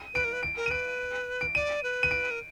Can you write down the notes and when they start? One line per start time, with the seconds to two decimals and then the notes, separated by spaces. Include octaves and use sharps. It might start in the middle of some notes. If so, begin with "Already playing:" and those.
Already playing: D#7
0.14 B4 D7
0.25 A#4
0.33 B4
0.43 D7
0.57 A#4
0.66 D#7
0.70 B4 D7
1.41 D7
1.55 D5 D#7
1.83 B4
2.03 D#7
2.11 D7
2.31 A#4